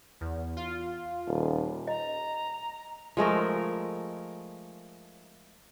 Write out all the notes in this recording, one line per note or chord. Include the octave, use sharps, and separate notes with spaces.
E2
F4
D#1
D#5 A#5
F3 G#3 A3 A#4